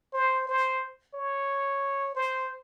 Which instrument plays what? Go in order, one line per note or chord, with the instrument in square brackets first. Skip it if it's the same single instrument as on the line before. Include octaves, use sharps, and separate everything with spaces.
[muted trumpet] C5
C5
C#5
C5